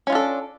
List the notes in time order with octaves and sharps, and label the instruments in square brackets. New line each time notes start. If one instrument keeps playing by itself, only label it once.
[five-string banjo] C#4
F4
D4
A4